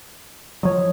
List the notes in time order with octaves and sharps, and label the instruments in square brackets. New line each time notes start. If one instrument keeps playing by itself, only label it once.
[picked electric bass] F3 F#3 [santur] C#5 D#5